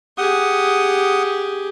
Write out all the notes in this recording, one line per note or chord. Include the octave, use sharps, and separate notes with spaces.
G4 G#4 F#5 D#6